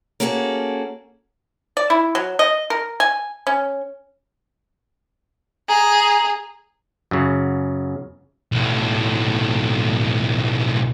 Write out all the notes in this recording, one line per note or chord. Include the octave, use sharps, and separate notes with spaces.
A#3 C#4 F#4 G#4 A4
D5
E4
F#3
D#5
A#4
G#5
C#4
G#4 A#5
F#2 C#3
B1 A2